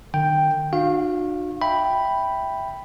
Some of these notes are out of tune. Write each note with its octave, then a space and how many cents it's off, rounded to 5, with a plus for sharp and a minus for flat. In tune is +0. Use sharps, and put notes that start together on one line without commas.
D#3 -45 G5 +0
D4 +40 F#4 -35 F5 +0
E5 -5 G5 +0 B5 +0